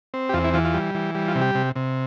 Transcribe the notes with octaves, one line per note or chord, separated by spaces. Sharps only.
C4
G4
E2 F4
E4
E3 F4
F4
G3
E3
G3
F4
C3
G4
C3
C3